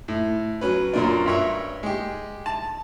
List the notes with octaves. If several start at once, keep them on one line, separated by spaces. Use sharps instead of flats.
A2
F#3 C#4 B4
F#2 A#2 D4
G2 C#5 E5
G#3 G4
A5